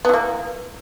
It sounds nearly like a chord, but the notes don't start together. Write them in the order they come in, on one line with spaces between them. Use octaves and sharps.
B3 E3 A#3